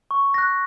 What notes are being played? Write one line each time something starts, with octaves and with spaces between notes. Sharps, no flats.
C#6
F#6 A#6